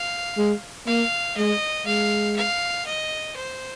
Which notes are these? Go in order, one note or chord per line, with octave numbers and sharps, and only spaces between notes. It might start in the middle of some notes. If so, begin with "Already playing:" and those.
Already playing: F5
G#3
A#3 F5
G#3 D#5
G#3 F5
F5
D#5
C5